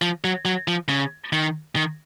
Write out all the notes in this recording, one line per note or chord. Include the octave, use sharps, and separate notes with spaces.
F3
F#3
F#3
F3
C#3
D#3
D#3